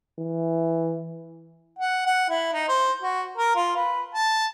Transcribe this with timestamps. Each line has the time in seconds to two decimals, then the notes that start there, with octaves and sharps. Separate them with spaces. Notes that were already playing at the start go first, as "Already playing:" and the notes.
0.19 E3
1.79 F#5
2.06 F#5
2.29 E4
2.53 D#4
2.68 C5
3.02 F#4
3.37 A#4
3.56 F4
3.76 B4
4.14 A5